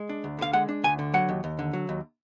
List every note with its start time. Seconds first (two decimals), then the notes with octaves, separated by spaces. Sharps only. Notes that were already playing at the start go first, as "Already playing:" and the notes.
Already playing: G#3
0.09 D4
0.24 D2
0.39 D3 F5
0.53 G#3 F#5
0.69 D4
0.84 D2 G#5
0.99 D3
1.14 F#3 F#5
1.29 D#2
1.44 D#2
1.59 D3
1.73 F#3
1.89 D#2